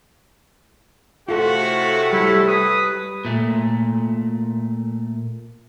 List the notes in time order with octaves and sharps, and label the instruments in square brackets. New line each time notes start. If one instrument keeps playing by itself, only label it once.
[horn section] A2 C3 A3 [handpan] F4 A4 [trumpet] F#4
[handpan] G3 [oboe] E4
[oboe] B4 [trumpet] D#6
[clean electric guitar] A#2 A3